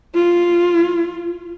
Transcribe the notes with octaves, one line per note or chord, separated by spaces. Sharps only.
F4